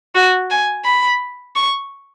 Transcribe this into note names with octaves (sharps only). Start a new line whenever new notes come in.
F#4
G#5
B5
C#6